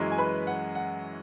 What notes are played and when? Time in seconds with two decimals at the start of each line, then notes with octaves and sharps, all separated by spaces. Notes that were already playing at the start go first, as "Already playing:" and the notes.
Already playing: F#2 E3 G#3 C#4
0.12 G#5
0.18 B4 B5
0.47 F#5
0.75 F#5